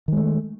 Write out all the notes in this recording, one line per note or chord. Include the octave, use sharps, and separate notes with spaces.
D#3 G#3 A3